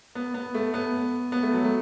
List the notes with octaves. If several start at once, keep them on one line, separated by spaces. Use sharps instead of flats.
B3
B3
A3
B3
B3
A3
F#3
A3